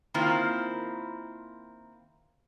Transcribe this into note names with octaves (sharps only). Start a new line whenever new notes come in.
D#3 A#3 C4 E4 F4